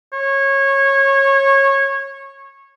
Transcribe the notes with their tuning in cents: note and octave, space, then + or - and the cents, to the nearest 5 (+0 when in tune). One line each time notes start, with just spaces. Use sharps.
C#5 -20